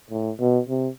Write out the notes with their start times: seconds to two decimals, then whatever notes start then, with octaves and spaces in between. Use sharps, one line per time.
0.11 A2
0.40 B2
0.69 C3